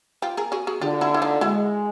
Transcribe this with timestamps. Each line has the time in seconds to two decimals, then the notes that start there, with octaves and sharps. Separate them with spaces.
0.22 F4 G4
0.37 G#4 A#4
0.52 F#4 G#4
0.67 F#4 G#4
0.81 D3 F4 G4
1.01 E4 F#4
1.14 E4
1.22 D#4 F4
1.41 G#3 E4 F#4